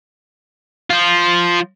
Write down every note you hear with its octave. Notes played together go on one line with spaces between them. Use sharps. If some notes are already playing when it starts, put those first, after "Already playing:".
F3 F4